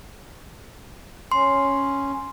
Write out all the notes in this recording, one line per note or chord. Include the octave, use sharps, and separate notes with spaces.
C#4 C6